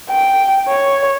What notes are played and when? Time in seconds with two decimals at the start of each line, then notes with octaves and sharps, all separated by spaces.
0.10 G5
0.69 C#5